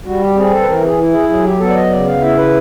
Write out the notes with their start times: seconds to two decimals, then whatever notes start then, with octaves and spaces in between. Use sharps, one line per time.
0.05 G3 F#4
0.20 G4
0.36 C4 G#4
0.51 A4
0.61 B4
0.67 E3 A#4
0.83 G#4
0.98 E4
1.13 G#4
1.29 F#3 G#4
1.44 G4
1.59 B3 A4
1.69 D5
1.76 D#5
1.90 C#3 D5
2.06 F5
2.21 E4 E5
2.36 B4